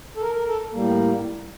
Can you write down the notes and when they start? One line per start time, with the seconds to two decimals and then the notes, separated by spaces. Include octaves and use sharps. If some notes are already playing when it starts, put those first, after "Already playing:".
0.17 A4
0.22 A#4
0.35 A#4
0.48 A4
0.74 A2 G3 A#3